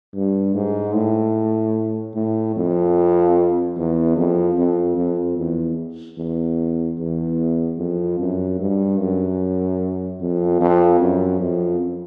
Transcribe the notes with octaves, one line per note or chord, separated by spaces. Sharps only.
G2
G#2
A2
A2
F2
E2
F2
F2
F2
E2
E2
E2
F2
F#2
G2
F#2
F2
F2
F#2
F2